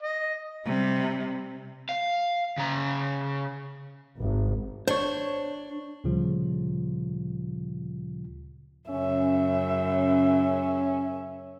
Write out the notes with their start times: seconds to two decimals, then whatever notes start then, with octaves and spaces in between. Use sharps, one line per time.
0.03 D#5
0.65 C3 G3
1.89 F5
2.58 C#3 A#5
4.17 G#1
4.88 D4 C5 C#5
6.04 D2 A#2 C#3 F3 G3 F4
8.90 F#2 C#3 C#4 E5